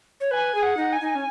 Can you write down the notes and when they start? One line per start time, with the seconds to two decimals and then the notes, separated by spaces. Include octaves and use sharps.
0.20 C#5
0.31 B4 G#5
0.55 G#4
0.62 F#5
0.77 D#4
0.92 G#5
1.01 D#4
1.15 C#4